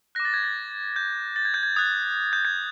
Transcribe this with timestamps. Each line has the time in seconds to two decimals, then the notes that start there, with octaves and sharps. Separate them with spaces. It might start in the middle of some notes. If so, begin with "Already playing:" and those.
0.15 D6 F#6 A#6
0.25 A6
0.34 G#6
0.44 A6
0.96 G6
1.36 A6
1.45 G#6
1.54 G6
1.63 G#6
1.76 D#6 F#6 G#6
2.33 G6
2.45 G#6